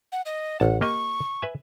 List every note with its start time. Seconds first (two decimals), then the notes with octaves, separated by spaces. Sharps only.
0.12 F#5
0.26 D#5
0.60 A1 F#5 A5
0.81 A#3 G4 D#5 C#6
1.42 B4 E5 G#5